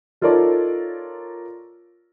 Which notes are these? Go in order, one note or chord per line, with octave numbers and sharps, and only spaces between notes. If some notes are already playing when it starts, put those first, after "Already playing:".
D#4 F4 A4 A#4 C#5 D5